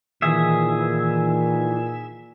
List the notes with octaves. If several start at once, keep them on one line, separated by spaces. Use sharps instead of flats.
A#2 D#3 E3 G#4 E5